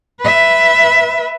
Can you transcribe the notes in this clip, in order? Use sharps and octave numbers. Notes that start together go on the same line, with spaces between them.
B4 E5